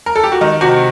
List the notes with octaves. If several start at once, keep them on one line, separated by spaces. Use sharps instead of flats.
A#4
A4
G4
F#4
D#3 D#4
C3 F#4